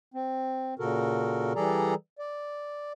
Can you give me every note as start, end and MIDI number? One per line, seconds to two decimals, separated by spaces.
0.14 0.74 60
0.79 1.53 46
0.79 1.53 49
0.79 1.53 66
0.79 1.53 69
0.79 1.53 70
1.56 1.94 52
1.56 1.94 55
1.56 1.94 68
1.56 1.94 69
1.56 1.94 74
1.56 1.94 82
2.19 2.92 74